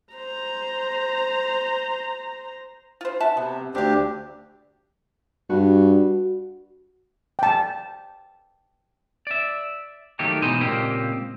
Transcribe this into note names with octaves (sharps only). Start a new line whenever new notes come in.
C5 A#5
F4 C5
F#4 E5 A5
C3 B3
D2 C4 D4 G4 F5
G2 F#4
G5 A5
D5 E5
D#3 F#3 A3 A#3 D#4 G4
B2 E3 G#3 D#4 C5 D#5
C#2 A#2 A#3 C4 G4 D#5